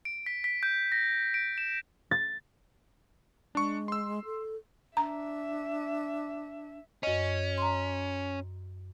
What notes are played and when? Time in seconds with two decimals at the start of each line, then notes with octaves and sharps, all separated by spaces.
0.05 D7
0.26 B6
0.44 B6
0.63 G6
0.92 A#6
1.34 D7
1.58 E7
2.11 A6
3.55 G#3 D4 C#6
3.88 C6 E6
4.25 A4
4.97 D4 E5 A#5
7.03 F#2 C#4 D#5
7.58 A#5 C6